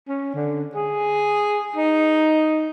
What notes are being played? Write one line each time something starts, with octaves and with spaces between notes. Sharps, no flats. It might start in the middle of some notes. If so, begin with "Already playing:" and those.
C#4
D3
G#4
D#4